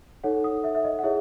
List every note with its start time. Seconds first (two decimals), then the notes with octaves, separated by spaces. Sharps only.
0.24 D#4 A4 C#5 F#5
0.44 D#6
0.64 E5
0.75 E5
0.84 D#5
0.99 F#5
1.03 E4 G#4 C#5 E5